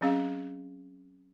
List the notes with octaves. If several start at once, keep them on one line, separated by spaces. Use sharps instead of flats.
F#3 C4 C#4 G#4 F5